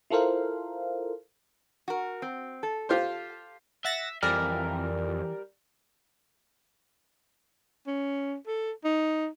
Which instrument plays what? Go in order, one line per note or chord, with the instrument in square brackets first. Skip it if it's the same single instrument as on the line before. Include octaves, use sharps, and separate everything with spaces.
[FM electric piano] E4 F4 A4 A#4 C5 F5
[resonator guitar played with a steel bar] F#4 A#4
C4
A4
[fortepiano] F4 G4 C5
[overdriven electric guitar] E5 [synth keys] F#5 A6 A#6
[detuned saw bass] F2 [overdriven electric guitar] E3 [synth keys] G3 A#4 D5 [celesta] F6
[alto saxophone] C#4
A4
D#4